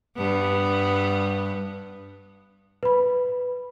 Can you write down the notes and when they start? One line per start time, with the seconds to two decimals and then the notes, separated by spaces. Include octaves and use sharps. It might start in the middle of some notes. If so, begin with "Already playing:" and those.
0.17 G2 B3
2.83 B4 B5